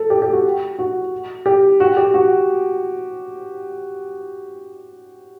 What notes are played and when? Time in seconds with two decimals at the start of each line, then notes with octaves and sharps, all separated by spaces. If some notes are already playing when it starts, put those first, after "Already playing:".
Already playing: A4
0.10 G4
0.22 G4
0.33 F#4
0.79 F#4
1.46 G4
1.80 F#4
1.97 G4
2.14 F#4